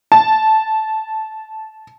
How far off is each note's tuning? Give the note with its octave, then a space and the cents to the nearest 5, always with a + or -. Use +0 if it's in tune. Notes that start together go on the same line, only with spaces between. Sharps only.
A5 -10